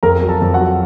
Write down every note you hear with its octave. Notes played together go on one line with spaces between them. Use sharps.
F2 A#4 A#5
F#3
A4 A5
F2
F#4 F#5
F#3